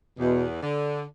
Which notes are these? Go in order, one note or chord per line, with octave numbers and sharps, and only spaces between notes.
E2 B2
D3